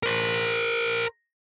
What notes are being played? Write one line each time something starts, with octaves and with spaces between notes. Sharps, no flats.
A#4 C5